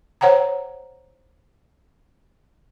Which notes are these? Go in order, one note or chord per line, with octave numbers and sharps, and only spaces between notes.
C5 C#5 F#5 G5 A#5